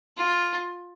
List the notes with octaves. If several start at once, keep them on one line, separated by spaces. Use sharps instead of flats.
F4